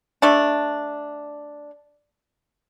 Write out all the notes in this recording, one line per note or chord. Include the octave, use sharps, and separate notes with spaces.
A3 D4